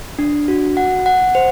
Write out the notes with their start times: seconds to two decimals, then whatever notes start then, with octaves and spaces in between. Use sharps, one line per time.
0.19 D4
0.48 F#4
0.77 F#5
1.06 F#5
1.35 C5